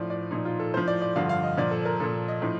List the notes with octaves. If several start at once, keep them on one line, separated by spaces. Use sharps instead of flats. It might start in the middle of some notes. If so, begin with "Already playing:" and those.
Already playing: A2 F3 D5
D5
A#2 F3 D#4
F4
A4
A2 F3 C5
D5
D5
G2 D3 F3 F5
F5
D#5
A#2 F3 D5
A4
A#4
A#2 F3 A4
D#5
A2 F3